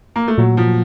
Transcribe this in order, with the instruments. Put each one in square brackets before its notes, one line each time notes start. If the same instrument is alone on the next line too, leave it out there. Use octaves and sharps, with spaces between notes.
[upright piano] A#3
A3
[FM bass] A#2 [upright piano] F#3
[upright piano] F3